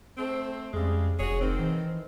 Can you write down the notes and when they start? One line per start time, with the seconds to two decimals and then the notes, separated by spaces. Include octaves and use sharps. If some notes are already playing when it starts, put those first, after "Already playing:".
0.18 A3 C4
0.73 F2 C#3 G3 G#3
1.20 F1 F#4 G#4 C#5
1.41 D#3 C4
1.59 E3